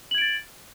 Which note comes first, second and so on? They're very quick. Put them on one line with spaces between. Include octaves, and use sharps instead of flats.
F#7 G#6 D7 A6